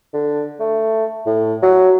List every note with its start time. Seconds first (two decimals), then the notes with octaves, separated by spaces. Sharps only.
0.14 D3
0.60 A3
1.27 A2
1.63 F#3